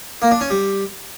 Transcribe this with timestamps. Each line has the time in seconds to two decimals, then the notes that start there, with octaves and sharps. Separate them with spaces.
0.22 A#3
0.31 D4
0.41 C#4
0.50 G3